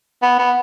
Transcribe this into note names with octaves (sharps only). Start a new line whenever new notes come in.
B3
B3